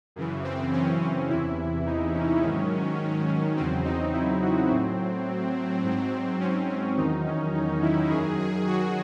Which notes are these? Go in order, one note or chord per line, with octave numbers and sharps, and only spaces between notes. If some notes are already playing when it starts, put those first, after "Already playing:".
F#2 C#3 E3
C4
C#4
C#4
E2 C3 E3 E4
D#4
C#4
G#2 D#3 F#3
E2 C#3 F#3 C4
D#4
E4
F#4
A2 F#3 C4
G#2 F#3
C#4
C#4
E2 D#3 F#3 D#4
C#4
D#4
E4
F#2 D#3 F#3 G#4
G#4
F#4